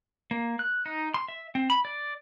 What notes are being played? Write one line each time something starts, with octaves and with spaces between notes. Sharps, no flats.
A#3
F#6
D#4
C6
E5
C4
B5
D5